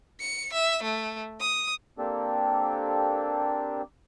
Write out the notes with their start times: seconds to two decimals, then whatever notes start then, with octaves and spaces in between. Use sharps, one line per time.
0.21 C#7
0.53 E5
0.83 A3
1.40 D#6
1.98 A#3 C4 D4 G4 A4